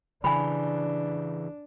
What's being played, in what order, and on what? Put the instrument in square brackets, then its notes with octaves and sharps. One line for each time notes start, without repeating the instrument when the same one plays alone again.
[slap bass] C#3 E3 [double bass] D4 [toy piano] G#5 B5